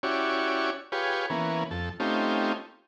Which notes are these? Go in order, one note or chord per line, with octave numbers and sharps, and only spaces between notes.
C#4 E4 F#4 G4 C#5 D5
F4 G4 G#4 B4 C#5
E3 A#3 B3 C#4
F2 A4
A3 C4 C#4 D#4 F4 G4